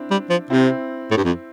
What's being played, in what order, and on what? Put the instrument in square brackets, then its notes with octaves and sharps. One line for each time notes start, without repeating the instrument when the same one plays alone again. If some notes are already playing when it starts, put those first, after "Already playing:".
Already playing: [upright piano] C4 D4 E4
[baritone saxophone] G3
F3
[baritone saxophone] C3 [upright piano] C4 E4
[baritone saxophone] A2
G2
F2